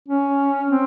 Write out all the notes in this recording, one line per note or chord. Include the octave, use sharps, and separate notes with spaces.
C#4
C4